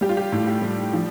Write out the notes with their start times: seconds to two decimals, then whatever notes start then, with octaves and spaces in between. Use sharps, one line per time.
0.01 G3 G4
0.09 F4
0.17 G4
0.32 A2
0.47 G4
0.62 G3
0.93 F3